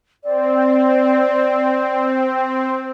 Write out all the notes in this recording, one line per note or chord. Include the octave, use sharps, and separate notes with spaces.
C4 D5